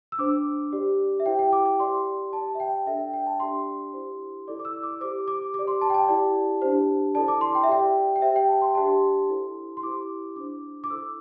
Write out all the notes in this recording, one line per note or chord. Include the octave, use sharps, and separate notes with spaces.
E6
D4 C5 D6
G4 D5
E5
E4 G4 C5 G5
G5
D6
D6
G4 D5 C6
G4 D5 A5
E5
G5
D4 A4 D5 E5
G5
G5
A5
D4 G4 D5 C6
E4 G4 C5
E4 A4 D5 D6
D6
E6
D6
G4 C5 D6
D6
G4 D5 D6
C6
A5
G5
A5
E4 G4 D5
D4 G4 C5
E4 A4 D5 A5
D6
C6
G5
E5
G4 D5 G5
G5
G4 C5 E5
G5
A5
C6
D4 G4 D5 A5
C6
E4 A4 C5
C6
E4 G4 C5 D6
D4 C5 D6
D6
E4 A4 C5 E6